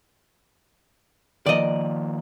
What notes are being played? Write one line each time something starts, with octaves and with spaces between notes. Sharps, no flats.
D#3 F3 A#3 D5 D#5